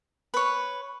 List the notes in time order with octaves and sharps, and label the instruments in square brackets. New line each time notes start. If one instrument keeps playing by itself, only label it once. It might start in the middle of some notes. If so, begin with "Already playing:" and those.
[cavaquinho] B4 C#5